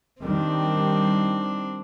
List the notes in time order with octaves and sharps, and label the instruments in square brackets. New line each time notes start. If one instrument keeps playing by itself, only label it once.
[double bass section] D#3 G3 [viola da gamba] C4 D4